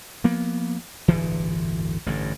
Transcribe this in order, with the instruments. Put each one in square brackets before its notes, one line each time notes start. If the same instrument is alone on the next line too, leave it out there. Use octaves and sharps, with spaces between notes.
[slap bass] F3 A#3 B3
D1 G1 A#2 E3
A1 G2 D3